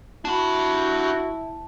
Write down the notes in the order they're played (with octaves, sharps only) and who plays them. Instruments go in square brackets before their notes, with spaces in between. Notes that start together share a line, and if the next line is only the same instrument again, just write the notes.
[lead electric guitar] D4 B5 [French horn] E4 [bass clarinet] F#4 [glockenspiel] A5